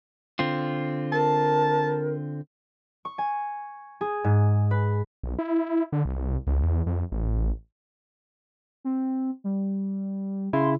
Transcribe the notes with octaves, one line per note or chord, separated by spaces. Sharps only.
D3 C4 F4
A#4 A5
C#6
G#5
G#4
G#2
B4
B1
E4
D3
C2
C#2
E2
F2
A1
C4
G3
C#3 E4 C6